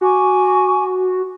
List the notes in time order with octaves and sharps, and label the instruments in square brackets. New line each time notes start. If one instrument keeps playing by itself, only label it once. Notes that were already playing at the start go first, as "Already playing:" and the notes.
[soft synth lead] F#4 [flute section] G#5 C#6 D6